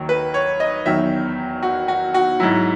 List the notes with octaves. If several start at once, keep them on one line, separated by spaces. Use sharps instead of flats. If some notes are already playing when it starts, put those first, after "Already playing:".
Already playing: D#2 D#3 F#3
B4
C#5
D#5
E2 D#3 F#3 E5
F#4
F#4
F#4
G#2 F#3 E4